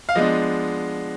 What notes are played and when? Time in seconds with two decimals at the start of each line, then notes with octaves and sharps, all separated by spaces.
0.09 F5
0.15 F3 G#3 B3 D4 D#5